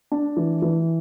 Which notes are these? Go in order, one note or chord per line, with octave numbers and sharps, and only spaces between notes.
D4
E3
E3